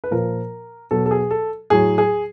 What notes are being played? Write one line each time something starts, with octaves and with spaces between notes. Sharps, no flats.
B4
A#2 F3 A#4
B2 F#3 A4
A4
G#4
A4
A2 F#3 G#4
G#4